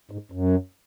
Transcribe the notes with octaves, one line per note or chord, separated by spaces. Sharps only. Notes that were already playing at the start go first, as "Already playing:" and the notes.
G#2
F#2